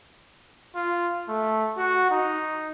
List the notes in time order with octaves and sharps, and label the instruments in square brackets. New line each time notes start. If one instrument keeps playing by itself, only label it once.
[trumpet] F4
A3
F#4
D#4